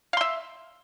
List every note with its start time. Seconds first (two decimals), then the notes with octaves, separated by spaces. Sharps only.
0.13 F5
0.17 C6
0.21 E5